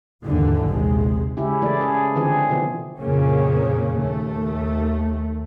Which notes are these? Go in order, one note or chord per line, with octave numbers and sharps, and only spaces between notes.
D#2 G#2 D3 E3
A#1 D#2 C3 G#3
C#3 G#3 C#4 E4 G4
C#3 E3 A3 G#4 D5
G#4
D3 E3 F3 C4 G#4
B2 D3 E3 F3 B3
F2 A#2 C#3 A#3 C#4
D#2 A3